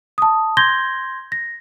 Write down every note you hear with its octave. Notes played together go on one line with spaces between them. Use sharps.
A5 D#6
C6 G6 G#6 A#6 G7
A#6